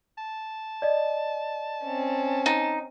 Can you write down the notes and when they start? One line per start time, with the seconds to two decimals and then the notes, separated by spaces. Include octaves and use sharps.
0.18 A5
0.82 D5 D#5
1.85 C4 C#4
2.46 D#4